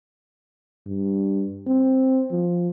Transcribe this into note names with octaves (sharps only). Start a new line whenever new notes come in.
G2
C4
F3